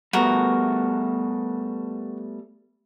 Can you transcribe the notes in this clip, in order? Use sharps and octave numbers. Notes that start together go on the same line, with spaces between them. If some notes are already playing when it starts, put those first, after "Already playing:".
G3 A3 B3 F#4 A#4